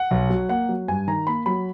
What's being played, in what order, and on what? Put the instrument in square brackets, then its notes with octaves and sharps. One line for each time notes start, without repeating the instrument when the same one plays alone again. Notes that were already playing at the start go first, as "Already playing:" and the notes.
Already playing: [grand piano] F#5
B1
F#3
A#3 F#5
F#3
G2 G#5
D#3 A#5
A#3 B5
F#3 B5